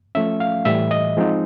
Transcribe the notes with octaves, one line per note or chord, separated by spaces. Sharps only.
F3 A3 C#4 E5
F5
A2 E3 G3 E5
D#5
F3 G#3 C4 D#4